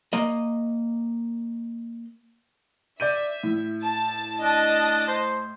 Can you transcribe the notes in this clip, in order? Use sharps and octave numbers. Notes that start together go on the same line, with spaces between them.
A#3 D#5
D5 E5 G6 D#7
A2
A5
D4 D#5 A5
C5